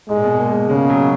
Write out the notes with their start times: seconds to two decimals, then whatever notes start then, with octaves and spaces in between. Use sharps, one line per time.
0.09 G#2 G#3
0.16 A#2
0.24 B2
0.39 A#3
0.53 A#3
0.69 C#3 G#3
0.90 F#3